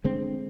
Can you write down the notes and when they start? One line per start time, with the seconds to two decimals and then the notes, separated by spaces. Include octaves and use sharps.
0.04 D3 G#3 C4